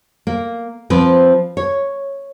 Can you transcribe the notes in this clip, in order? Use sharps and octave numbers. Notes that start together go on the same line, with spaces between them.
A#3
F3 C4 B4
C#5